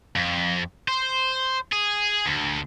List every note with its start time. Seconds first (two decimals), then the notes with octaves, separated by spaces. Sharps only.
0.16 F2
0.88 C5
1.72 G#4
2.26 D2